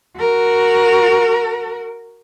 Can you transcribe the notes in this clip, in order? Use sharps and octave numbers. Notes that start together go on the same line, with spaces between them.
F#4 A#4